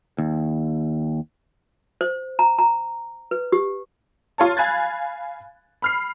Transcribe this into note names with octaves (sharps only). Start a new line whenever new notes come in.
D#2
C5
A#5
A#5
B4
G4
F4 C#5 A5
F5 G#5 B5 F#6 G#6 A6
B5 F6 C7